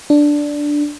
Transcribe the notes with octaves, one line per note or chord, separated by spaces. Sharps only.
D4